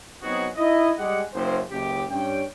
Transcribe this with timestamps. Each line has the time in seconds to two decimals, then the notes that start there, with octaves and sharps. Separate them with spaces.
0.22 F#3 B3 C4 D#4 F#4 G#4
0.56 D#4 E4 D#5
0.98 G3 G#3 G4 G#4 F#5
1.34 F#1 C5
1.70 F#1 C#2 G4
2.10 G2 C#4 G5